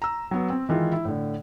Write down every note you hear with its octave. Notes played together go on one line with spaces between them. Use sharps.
A#5 E6
F#3 B3
C4
D#3 E3 G#3 F4
E4
A2 D3